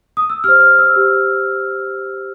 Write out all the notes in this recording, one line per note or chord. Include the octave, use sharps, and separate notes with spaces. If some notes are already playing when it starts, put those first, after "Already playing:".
D#6
E6
G4 C5 F6
F6
E6
G4 C5